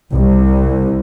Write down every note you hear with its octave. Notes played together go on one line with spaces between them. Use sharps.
C2